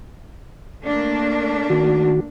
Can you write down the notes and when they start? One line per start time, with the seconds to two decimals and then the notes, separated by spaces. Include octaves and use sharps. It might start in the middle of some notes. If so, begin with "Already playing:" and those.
0.84 A3 A#3 D4
1.70 D#3 F#4